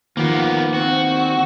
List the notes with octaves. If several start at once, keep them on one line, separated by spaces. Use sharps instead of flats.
D#2 F3 A#3 B3
C4 F#4